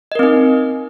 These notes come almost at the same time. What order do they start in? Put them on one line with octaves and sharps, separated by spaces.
D#5 A#4 C4 D#4